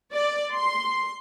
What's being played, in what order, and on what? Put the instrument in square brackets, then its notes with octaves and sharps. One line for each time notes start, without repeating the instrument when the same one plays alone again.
[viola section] D5
C6